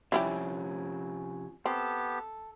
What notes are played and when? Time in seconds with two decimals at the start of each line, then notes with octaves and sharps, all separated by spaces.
0.12 C3 F3 G3 C#4 E4 G4
1.66 B3 C4 G4 A4